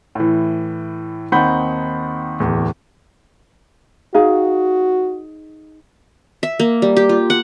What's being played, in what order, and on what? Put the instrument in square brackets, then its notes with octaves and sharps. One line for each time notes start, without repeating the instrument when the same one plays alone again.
[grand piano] A2 E3
D#2 C4 D#4 F#5 B5 G6
D1 E2
[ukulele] D#4 G#4 F5 [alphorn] F#4
[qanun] E5
A#3
G3
G4
F4
F#5